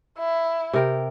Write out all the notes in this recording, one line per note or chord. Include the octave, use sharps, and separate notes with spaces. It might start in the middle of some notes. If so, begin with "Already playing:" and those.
E4
C3 A#4 G5